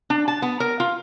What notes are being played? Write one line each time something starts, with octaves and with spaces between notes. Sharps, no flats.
D4
A5
B3
A#4
F4